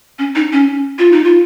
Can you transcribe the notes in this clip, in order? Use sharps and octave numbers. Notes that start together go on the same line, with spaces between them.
C#4
D#4
C#4
F4
D#4
F4